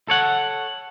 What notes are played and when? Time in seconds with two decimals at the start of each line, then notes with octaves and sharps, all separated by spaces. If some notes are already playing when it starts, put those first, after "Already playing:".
0.08 A4 C#5 F#5